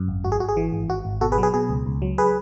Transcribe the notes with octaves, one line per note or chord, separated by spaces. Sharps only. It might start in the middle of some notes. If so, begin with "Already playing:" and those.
Already playing: F#2
G#1
G#1 F#4
G#4
G#1 F#4
G#4
E3
G#1
G#1 F#4
G#1
B2 F#4 A4
G#4 B4
F#3
G#4 B4
B2 G#4
C#2
C#2
F#3
G#4 B4